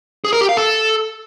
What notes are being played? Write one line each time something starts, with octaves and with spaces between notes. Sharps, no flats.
G#4
A#4
G4
F5
A4